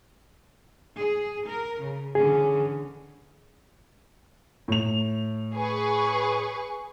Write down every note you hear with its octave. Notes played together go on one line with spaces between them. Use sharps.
G#4
A#4
C#3
D3 E3 C#4 G#4
A2 F7
G#4 B4 C#6